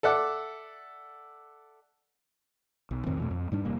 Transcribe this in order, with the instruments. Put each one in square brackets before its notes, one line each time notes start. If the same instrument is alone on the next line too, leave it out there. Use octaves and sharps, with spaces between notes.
[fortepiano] A4 D5 E5 F#5 D6
[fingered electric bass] B1
F2 A2 D#3 C4
E2 B2 A3
F2
G#2 G3 D4
F1 C3 G3 A#3